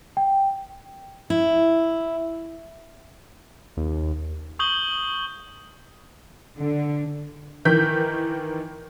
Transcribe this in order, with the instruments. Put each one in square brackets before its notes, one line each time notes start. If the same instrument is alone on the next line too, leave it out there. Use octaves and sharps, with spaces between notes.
[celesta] G5
[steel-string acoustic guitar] E4
[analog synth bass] D#2
[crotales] C#6 D#6 G6 F#7 G7
[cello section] D3
[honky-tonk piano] D#3 E3 A#4 G6 B6